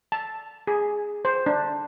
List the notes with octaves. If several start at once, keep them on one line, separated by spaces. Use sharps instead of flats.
A5
G#4
C5
D4